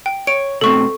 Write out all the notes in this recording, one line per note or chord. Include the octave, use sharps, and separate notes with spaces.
G5
C#5 D7
B2 A3 C4 A4 C#6